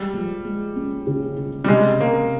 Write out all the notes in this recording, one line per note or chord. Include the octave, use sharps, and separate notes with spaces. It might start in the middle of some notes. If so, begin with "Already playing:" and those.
Already playing: G3 G#3
F3
G#3
C#4
C#3
C#3
G3
C3 G#3
C3 A#3